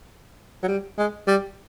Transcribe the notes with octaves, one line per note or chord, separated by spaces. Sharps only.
F#3
G3
G#3
G3